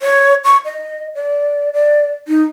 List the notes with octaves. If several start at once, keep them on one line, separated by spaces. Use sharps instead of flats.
C#5
C#6
D#5
D5
D5
D#4